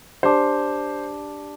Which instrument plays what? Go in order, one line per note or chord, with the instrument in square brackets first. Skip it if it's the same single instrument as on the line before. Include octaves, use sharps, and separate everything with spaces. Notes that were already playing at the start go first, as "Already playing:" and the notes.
[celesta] D4 G4 D5 A5 D6 [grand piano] C5